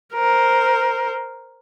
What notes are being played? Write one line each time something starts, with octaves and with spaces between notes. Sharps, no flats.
A#4 C5